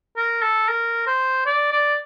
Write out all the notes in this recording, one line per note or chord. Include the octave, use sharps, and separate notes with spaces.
A#4
A4
A#4
C5
D5
D5